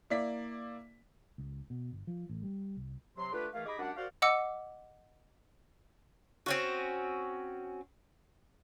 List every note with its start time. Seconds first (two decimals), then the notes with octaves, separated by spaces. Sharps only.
0.10 A#3 E4 D5 B6
1.38 C#2
1.70 B2
1.92 G1
2.07 F3
2.29 A1
2.43 G3
2.77 C2
3.17 C3 F#3 C6
3.33 D3 A3 F4 G4 B4
3.54 D#3 E3 A3 G#4 F5
3.66 D#4 G4 G#4 D#5 B5 D6
3.79 F#2 G#3 D4 G4 F#5
3.97 F#4 A#4 C5 D5 F5
4.22 D#5 F#5 D6 E6 C#7
6.46 C4 C#4 F#4